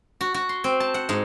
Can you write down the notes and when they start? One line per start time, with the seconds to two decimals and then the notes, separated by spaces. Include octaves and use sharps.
0.21 F#4
0.34 F#4
0.49 C6
0.64 C4
0.80 A5
0.94 F#5
1.09 G#2